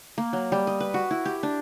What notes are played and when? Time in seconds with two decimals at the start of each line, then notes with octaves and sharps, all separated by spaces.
0.18 A#3
0.33 F#3
0.52 G3
0.67 D#5
0.80 B4
0.94 F#4
1.11 E4
1.25 G4
1.43 D4